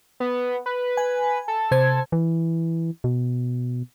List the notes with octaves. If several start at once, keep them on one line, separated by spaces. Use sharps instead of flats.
B3
B4
G#5
A4
C3 C5 G#6
E3
B2